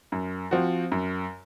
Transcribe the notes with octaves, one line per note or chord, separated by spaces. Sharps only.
F#2
F3 C4 F#4
F#2